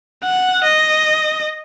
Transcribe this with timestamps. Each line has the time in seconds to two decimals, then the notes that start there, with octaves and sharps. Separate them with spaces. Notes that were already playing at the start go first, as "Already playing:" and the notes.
0.23 F#5
0.64 D#5